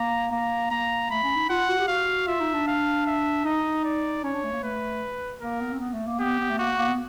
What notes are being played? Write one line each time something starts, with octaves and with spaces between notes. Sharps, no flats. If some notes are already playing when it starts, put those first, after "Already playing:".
Already playing: A#3 A#5
A#3 A#5
A#3 A#5
A3 B5
C#4
D#4
F4 F#5
F#4
G4
F#4 F5
F4 E5
D#4
D4
F5
E5
D#4 D#5
D5
C#4 C#5
D4
A3
A#3
A3 B4
A#3 A#4
B3
C4
B3
A3
A#3
B3 G4
B3
A3
A#3 F#4
A#3
B3